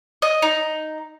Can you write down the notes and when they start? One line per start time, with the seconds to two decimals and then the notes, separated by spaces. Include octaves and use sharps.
0.22 D#5
0.42 D#4